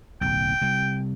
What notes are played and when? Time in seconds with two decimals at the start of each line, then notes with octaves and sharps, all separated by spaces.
0.21 D1 B1 G5
0.61 C3 G3